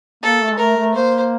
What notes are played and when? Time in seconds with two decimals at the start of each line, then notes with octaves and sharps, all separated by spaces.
0.23 A#3 A4
0.41 A3
0.52 G#3
0.59 A3 A#4
0.77 A3
0.94 A#3 C5